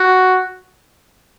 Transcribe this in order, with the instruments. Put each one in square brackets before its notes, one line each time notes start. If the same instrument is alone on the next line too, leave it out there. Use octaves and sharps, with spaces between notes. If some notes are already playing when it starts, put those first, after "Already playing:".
Already playing: [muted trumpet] F#4